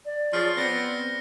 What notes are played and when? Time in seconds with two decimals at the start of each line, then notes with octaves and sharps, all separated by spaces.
0.05 D5
0.33 F3 G#4 C#5 F6
0.57 B3 C4 A#6 C#7